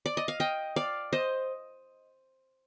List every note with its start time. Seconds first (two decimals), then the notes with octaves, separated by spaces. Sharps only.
0.06 D5
0.17 D#5
0.28 F5
0.40 D#5 G5
0.76 D5 F5
1.13 C5 D#5